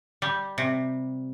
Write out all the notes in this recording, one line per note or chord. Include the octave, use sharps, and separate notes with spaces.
G3
C3